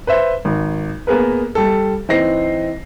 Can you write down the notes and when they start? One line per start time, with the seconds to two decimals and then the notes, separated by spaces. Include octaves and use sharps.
0.07 B4 C5 E5
0.45 G#1
1.07 A#3 B3 G#4 A#4 B4
1.55 G3 A4
2.09 E3 C4 D#4 A#6 C7